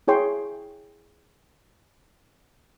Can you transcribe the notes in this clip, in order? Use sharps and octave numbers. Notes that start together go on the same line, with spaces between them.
E4 G#4 C#5 G5 C6